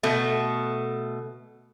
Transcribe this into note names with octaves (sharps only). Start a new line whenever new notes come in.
B2 A3